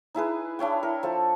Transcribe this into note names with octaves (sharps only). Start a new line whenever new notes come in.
D#4 E4 G#4 B4
D4 E4 C#5 G5
A#4
F3 A4